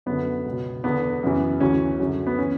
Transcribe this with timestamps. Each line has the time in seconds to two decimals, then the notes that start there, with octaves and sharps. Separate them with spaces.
0.06 F#2 D3 B3
0.46 C#2 B2
0.84 E2 D3 B3
1.23 F#2 C#3 E3
1.60 D2 C#3 E3 C#4
1.99 F#2 D3
2.26 B3
2.39 E3 C#4